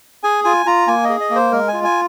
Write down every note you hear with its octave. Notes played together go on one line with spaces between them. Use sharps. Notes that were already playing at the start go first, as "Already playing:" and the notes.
G#4 G#5
F4 G#5
F4 A#5
A#3 G#5
G#4 D#5
D#5
A#3
C5
G#3 A#4
G#5
F4
G#5